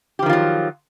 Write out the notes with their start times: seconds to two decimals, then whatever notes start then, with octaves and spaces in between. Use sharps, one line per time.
0.19 G4
0.23 F3
0.26 D#3
0.29 F4
0.33 F#3